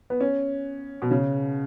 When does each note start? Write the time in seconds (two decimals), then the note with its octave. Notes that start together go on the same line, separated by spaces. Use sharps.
0.10 B3
0.20 C#4
1.02 B2
1.11 C#3